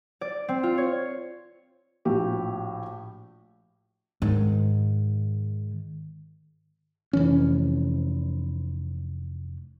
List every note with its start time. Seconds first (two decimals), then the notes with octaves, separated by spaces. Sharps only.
0.21 D5
0.49 C4
0.63 F4
0.78 C#5
2.05 A#1 A2 F#4 G4
4.22 G#2 D#3
7.13 F1 E3 C#4